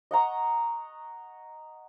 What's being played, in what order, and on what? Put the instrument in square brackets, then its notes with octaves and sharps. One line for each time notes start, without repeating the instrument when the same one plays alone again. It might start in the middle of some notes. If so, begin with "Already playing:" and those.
[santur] D#5 F#5 A#5 C#6